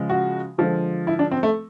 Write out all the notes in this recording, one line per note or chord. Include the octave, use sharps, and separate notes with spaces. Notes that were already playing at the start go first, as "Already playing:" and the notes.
Already playing: C#3 F3 G#3
F#4
D3 F3 G#3
E4
D4
C4
A3